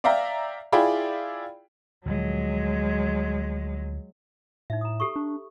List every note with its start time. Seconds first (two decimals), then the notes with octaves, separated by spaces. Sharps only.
0.04 D5 E5 F5 G5 A#5
0.72 E4 F4 G#4 D5 G5 B5
2.06 D2 A#2 F3 F#3 G#3
4.70 A2 D#4 E5
4.81 A#5 D#6
5.00 G4 A4 C#6
5.16 D4